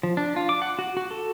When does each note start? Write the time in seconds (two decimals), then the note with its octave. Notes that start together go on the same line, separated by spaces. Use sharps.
0.03 F3
0.17 D4
0.36 F4
0.49 D6
0.62 F#5
0.79 F#4
0.97 F#4
1.11 A4